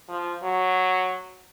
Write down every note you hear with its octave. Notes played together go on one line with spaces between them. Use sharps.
F3
F#3